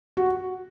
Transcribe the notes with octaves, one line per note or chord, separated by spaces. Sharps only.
F#4